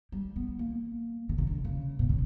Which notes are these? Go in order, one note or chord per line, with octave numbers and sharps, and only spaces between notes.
G3
B3
A#3
D3
C#3
D3
C#3
B2
C#3